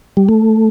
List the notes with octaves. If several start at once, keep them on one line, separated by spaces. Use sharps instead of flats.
G3
A3